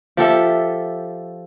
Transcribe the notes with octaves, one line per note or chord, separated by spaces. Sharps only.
F3 G4 A4 E5